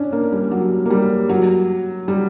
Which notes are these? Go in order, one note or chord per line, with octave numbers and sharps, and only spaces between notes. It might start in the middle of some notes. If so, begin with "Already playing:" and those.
Already playing: C#4 D4
A#3
G3
F#3
A#3
G3
F#3
G3